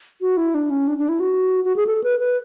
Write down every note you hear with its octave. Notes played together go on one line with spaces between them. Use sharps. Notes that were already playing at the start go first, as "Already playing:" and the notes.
F#4
E4
D4
C#4
D4
D4
E4
F#4
F#4
G#4
A4
B4
B4